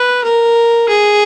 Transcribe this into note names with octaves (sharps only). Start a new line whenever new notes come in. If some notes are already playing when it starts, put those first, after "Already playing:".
Already playing: B4
A#4
G#4